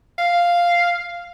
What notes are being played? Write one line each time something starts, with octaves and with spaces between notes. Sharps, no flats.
F5